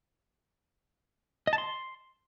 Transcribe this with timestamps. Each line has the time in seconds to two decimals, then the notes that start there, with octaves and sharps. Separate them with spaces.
1.47 D#5
1.53 A5
1.58 C6